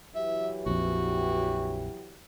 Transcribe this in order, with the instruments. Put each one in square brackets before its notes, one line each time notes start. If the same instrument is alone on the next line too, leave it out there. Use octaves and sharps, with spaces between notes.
[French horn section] E3 F#3 G4 [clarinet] E5
[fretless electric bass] A#1 F2 [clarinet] F#4